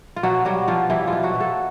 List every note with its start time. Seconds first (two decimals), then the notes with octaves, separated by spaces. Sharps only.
0.16 F4
0.23 B2 F#3 F#4
0.45 F#3 G3 F#4
0.68 B2 F3 F4
0.90 E3 G3 E4
1.07 F3 F4
1.13 B2
1.23 F#3 F#4
1.35 B2
1.40 A3 A4